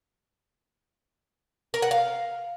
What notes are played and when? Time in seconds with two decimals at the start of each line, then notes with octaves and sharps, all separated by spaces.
1.74 A#4
1.82 F#5
1.91 F5